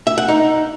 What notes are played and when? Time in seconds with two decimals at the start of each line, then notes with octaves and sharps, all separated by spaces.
0.07 E5
0.18 F#5
0.28 D#4